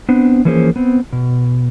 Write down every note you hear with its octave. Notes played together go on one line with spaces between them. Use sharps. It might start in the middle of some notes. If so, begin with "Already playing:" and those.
B3 C4 D4
E3 F3 A#3 C#4 G#4 C5
B3 C4
B2